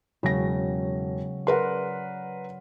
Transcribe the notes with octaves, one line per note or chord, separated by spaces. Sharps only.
E1 C#3 F#3 C#4 A#6
A#4 B4 D5 F#5 C6